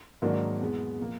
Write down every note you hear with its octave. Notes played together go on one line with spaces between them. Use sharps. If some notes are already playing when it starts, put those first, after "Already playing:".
G#2 D#3 F#3 A#3 D4
E2 B2 G#3 B3
A#2 F3 A#3